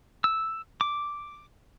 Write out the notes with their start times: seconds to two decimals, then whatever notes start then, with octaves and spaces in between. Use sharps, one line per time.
0.24 E6
0.81 D6